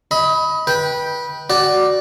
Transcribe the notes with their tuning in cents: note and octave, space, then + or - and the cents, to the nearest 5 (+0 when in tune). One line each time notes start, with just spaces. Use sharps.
D#5 +30 B5 +0
B4 -20 G5 +0
F#4 +10 D5 +0